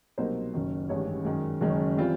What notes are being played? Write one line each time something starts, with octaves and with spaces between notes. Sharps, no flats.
C2 B2 F#3 A#3 D#4 C5
F#1 F#2 D#3
A1 G2 D#3 G#3 C#4 C#5
F#2 D#3 G#3
F#1 F#2 D#3 G#3 C#4
E3 G3 C4 F4